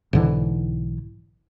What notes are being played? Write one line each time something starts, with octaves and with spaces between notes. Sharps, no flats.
B1 G#2 D3 E3